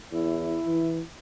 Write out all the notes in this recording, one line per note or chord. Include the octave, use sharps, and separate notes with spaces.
E2 E4
E3